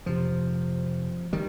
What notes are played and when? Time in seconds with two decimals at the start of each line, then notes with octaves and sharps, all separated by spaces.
0.06 F2 C3 F3
1.33 D#3 G3